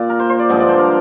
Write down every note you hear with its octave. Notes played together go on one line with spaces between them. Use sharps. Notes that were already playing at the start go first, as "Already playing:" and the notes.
Already playing: A#2 D5
A#4
C5
C5
D5
G2 D3 F3 G#3 D#5
D5
C5
A#4